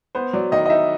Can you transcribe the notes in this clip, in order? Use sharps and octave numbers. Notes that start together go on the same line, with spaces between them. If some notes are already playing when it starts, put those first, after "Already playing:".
B3 C5
F#3 D5
D#3 D#5
D#5
D#4 E5